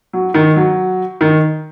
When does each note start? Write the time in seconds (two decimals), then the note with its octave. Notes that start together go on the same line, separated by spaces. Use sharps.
0.13 F#3
0.34 D#3
0.56 F#3
1.21 D#3